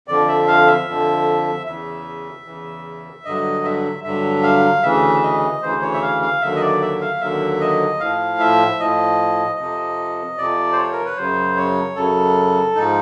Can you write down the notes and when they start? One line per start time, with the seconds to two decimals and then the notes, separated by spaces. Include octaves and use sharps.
0.08 F2 D3 F3 D5
0.28 E5
0.48 F5
0.67 E5
0.87 F2 D3 F3
1.66 E2 C#3 E3 E5
2.45 E2 C#3 E3
3.25 G2 D3 F#3 D#5
3.65 E5
4.04 G2 D3 F#3 E5
4.43 F5
4.83 D2 C#3 E3 E5
5.23 D#5
5.63 D2 C#3 E3 C5
5.82 C#5
5.94 E5
6.02 F5
6.22 F5
6.41 D#2 D3 F#3 E5
6.56 D#5
6.62 D5
6.81 E5
7.01 F5
7.21 D#2 D3 F#3 E5
7.61 D#5
8.00 A2 F3 F5
8.40 E5
8.80 A2 F3 D#5
9.59 F2 C3 F3
10.38 F2 C3 F3 D5
10.72 C5
10.77 C#5
10.92 A#4
11.05 B4
11.17 F#2 C#3 F#3 C5
11.57 C#5
11.96 F#2 C#3 F#3 A4
12.75 G#2 F3 D#4